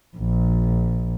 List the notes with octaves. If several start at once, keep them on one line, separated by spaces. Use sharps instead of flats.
A#1